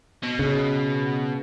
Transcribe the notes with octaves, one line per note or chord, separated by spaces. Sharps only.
B2
C#3